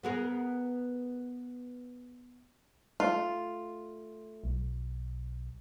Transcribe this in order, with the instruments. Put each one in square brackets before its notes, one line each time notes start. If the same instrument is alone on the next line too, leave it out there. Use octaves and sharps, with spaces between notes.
[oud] B3 G#4 A#4
[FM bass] A3 [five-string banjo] F4
[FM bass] B1